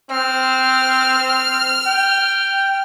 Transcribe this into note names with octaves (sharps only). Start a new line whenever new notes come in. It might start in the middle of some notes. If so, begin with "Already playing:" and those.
C4 F6
G5